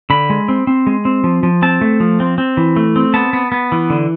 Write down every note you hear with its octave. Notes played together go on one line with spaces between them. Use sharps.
D3 B5
G#3
C4
C4
G#3
C4
F3
F3
C4 A5
A3
F3
C4
C4
E3
A3
C4
B3 A5
B3
B3
E3
D3